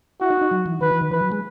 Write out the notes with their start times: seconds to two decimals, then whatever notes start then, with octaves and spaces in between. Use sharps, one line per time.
0.21 E4 F#4
0.31 D#4
0.41 D#4
0.51 F#3
0.66 E3
0.81 D#3 B4
0.92 E3
1.01 D#3
1.12 E3 B4
1.21 F#3
1.32 G#3